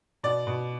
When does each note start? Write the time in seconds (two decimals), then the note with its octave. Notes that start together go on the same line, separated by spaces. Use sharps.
0.23 B2 D5
0.47 B2